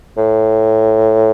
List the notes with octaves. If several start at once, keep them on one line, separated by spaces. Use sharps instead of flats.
A2